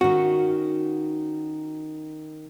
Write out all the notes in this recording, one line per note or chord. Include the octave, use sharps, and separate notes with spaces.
D#3 C#4 F#4